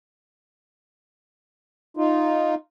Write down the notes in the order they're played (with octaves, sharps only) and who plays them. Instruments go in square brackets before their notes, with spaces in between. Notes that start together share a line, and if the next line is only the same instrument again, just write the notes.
[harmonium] D#4 F4